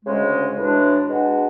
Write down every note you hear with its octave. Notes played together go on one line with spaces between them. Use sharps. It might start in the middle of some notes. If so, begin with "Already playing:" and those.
D2 C#3 G#3
A2 E3 G#3 D4 F#4
B2 G#3 D4 F#4